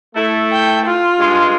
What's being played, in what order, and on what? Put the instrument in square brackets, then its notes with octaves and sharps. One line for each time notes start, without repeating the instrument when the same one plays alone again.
[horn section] A3 E4 A4
[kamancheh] G5
F4
[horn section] G2 G#3 C6